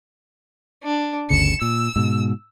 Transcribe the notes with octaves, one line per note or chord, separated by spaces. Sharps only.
D4
G1 D2 C#3 C#7 E7
A#2 E6
G#2 B2